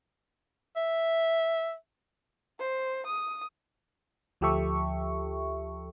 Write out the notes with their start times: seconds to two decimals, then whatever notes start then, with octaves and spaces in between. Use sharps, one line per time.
0.76 E5
2.59 C5
3.07 D#6
4.41 D2 F3 G4 A4 E5 C#6